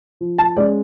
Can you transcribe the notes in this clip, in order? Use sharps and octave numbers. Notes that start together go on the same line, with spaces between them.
F3
A5
G#3 C#4 D5